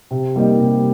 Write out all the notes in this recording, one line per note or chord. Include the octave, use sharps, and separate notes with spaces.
C3
G3 A#3 D#4 G4
C3